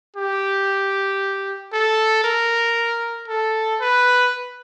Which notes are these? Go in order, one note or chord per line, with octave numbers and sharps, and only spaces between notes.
G4
A4
A#4
A4
B4